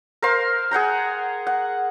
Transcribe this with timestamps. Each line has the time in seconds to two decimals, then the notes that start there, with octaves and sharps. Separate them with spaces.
0.22 A#4 C5 F5 C6
0.71 G#4 F#5 G5 A#5
1.47 F#5